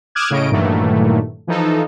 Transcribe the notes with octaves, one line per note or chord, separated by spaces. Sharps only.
D6 D#6 F6 F#6 G#6 E7
A2 C#3 C#4 D#5 D7
G2 A#2 D#3 E3 F#3 A3
E3 F3 D#4 A4